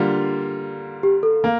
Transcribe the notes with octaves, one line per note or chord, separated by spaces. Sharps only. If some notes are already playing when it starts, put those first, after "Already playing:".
Already playing: D3 G3 A#3 F4
G4
A4
A#3